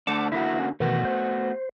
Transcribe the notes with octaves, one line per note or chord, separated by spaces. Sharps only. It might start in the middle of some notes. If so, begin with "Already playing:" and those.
D3 A3 D4 F#5 A5 D6
D3 A#3 E4 F#4 E5
C#4
B2 D#3 E3 A3 B3 F#4
C5